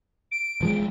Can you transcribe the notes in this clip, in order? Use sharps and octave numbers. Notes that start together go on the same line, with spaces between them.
D7
E1 F3 G#3